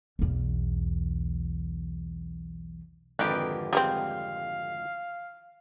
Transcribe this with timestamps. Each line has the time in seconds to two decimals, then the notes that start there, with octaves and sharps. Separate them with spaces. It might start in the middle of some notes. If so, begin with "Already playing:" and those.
0.19 B1 E2
3.19 G#1 F2 D3 G4 A#4 B4
3.73 G3 G#3 C4 F5